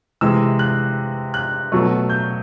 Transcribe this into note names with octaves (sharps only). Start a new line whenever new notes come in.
C3 E3 G#3 E6
F#6
F#6
B2 F#3 A3
G6